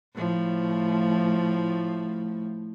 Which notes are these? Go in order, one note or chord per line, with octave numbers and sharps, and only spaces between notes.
A2 F3 A3